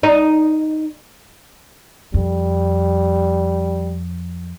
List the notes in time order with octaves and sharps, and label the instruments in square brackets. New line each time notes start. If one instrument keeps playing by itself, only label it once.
[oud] D#4
[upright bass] F2 [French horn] G3